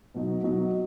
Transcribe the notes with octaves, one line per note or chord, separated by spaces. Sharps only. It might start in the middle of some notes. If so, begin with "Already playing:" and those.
B2 F#3 D#4
B2 F#3 D#4